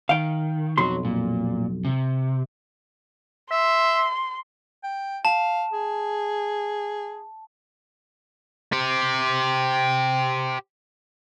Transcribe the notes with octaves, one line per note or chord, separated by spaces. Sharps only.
D#3 F5 G5
B1 F2 F#3 C6
A#2
C3
E5 C6
G5
F5 A5
G#4
G4 C5